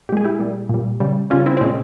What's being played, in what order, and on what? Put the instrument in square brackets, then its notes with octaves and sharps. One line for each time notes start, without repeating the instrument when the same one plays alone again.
[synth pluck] A#2 G4
G#3 G#4
E4 G4
A#2 G3
A#2 G3
C#3 G3
C#3 G3 C#4 F4
C4 E4
C4
A#2 G#3 C#4